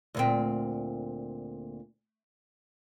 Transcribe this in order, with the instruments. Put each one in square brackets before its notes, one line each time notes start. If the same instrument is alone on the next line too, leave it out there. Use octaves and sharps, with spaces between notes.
[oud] D2 A#2 C4